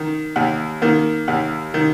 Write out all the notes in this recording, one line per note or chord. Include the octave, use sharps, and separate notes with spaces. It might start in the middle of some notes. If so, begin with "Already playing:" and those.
Already playing: D#3
D#2
D#3 A#3
D#2
D#3